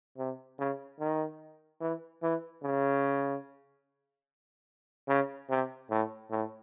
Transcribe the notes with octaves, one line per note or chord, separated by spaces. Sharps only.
C3
C#3
D#3
E3
E3
C#3
C#3
C3
A2
A2